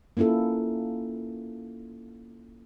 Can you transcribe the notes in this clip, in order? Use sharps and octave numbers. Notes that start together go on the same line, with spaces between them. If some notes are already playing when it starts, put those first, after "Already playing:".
A#3 C#4 E4 F4 A4